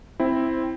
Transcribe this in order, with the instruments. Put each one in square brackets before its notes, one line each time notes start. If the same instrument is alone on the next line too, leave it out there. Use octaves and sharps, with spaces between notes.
[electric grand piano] C4 E4